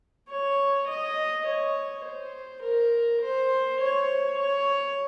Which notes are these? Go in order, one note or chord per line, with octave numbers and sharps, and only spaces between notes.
C#5
D#5
C#5
C5
A#4
C5
C#5
C#5